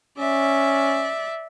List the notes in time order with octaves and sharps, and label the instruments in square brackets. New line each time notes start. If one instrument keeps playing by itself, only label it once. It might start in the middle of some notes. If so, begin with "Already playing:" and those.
[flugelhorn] C#4 [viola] D5 E5